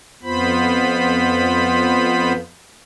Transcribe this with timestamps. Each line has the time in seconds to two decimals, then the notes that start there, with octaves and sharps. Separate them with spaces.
0.23 F2 B3 F4 C5 B5